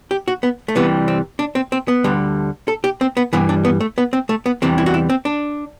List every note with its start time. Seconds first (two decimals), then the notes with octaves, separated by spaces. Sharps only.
0.11 G4
0.28 F#4
0.43 B3
0.68 A3
0.75 C2 C3 E3 G3 B3
1.08 C4
1.39 D4
1.55 C4
1.72 C4
1.88 B3
2.04 D2 D3 G3
2.68 A4
2.84 G4
3.01 C4
3.17 B3
3.33 G2 E3 G3 B3
3.49 D4
3.65 B3
3.80 A3
3.98 B3
4.13 C4
4.29 A3
4.46 B3
4.62 E2 C3 E3 G3 C4
4.78 E4
4.86 F#4
4.94 E4
5.09 C4
5.25 D4